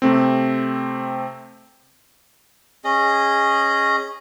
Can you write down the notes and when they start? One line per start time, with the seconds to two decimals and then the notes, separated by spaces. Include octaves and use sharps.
0.02 C3 A3 C4
2.84 C#4 G#4 D#5